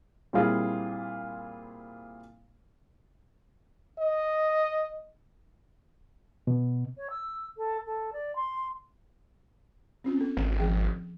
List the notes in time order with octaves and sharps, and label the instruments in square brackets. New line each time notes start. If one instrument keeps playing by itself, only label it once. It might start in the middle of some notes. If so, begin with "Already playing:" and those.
[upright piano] A#2 G3 C4 E4 F4 G#4
[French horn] D#5
[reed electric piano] B2
[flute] C#5
E6
A4
A4
D5
C6
[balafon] C4 C#4 F4
B3 A4
[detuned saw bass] G#1
[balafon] F3 G#4 G5